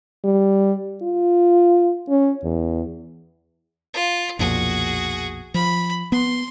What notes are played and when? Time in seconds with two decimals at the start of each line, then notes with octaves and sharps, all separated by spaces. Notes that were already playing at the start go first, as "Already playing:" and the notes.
0.25 G3
1.02 F4
2.09 C#4
2.44 E2
3.94 F4
4.39 B1 F2 A#2 F#4 G#4
5.54 F3 B5
6.12 B3 C6